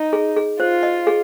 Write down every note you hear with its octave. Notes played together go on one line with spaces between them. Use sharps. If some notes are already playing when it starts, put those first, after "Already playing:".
Already playing: D#4
G#4
G#4
F4 C5
D#5
G#4